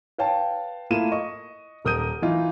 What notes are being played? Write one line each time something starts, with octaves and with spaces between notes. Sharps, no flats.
B4 C#5 F5 G5 A5
A3 A#3 E4 F4 D#7 E7
D#5 C#6
D#1 A#4 D#6 G6 D#7
E3 D#4 F4